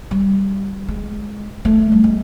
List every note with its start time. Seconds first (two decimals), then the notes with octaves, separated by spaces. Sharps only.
0.11 G3
0.88 G#3
1.65 A3
1.92 G3
2.04 G#3